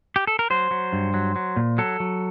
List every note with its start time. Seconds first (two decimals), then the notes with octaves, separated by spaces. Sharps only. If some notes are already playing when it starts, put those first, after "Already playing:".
0.16 G4
0.27 A4
0.39 A#4
0.50 F#3 C5
0.71 F#3
0.93 G2
1.14 F#3
1.36 F#3
1.56 A#2
1.78 F#3 A4
2.00 F#3